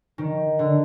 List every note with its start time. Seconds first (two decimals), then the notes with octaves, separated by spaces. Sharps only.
0.18 D#3
0.59 D3